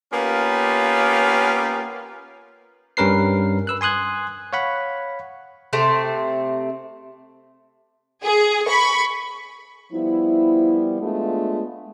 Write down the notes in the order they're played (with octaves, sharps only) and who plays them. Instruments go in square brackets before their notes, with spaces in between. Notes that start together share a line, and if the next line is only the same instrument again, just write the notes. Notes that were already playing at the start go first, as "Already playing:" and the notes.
[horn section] A#3 B3 C#4 F4 G4
[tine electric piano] G2 G3 C#4 A#4 B4 C7
B4 E6 F#6
G#5 C6 D#6 F#6 G#6
C#5 F5 F#5 B5
[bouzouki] C3 A3 C4
[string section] G#4
B5 C#6
[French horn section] F3 G3 B3 E4
G#3 A3 B3 D4 F4